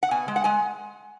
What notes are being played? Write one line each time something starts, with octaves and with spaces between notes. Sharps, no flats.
F#5
B2 G#5
G#3
F#5
G#3 G#5